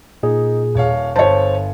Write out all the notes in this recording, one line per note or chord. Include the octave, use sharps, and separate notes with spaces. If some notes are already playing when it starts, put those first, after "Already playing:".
A#2 D#4 G#4
D#1 C#5 F5
G1 C5 C#5 A5